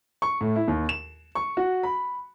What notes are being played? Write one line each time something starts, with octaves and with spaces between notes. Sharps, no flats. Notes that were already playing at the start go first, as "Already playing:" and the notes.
C#6
A2
E4
D#2
E7
C#6
F#4
B5